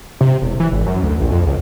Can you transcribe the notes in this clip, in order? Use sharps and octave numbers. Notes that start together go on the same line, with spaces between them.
C3
E1
E3
G#1
F#2
D2
A#1
F2
C#2